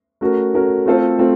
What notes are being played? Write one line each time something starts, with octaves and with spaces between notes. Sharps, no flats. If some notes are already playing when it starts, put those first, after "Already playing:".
A3 C#4 F#4 A#4
A3 C#4 F#4 A#4
A3 C4 F4 A4 C5
A3 C4 F4